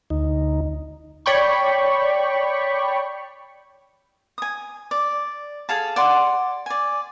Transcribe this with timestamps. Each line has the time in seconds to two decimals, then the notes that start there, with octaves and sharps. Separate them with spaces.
0.10 D2 D#4
1.26 C#5 D5 G5 B5 C#6
4.38 G#5 D#6
4.91 D5
5.69 G#4 A4 F5 A5
5.96 D5 F#5 C6
6.66 D5 G#5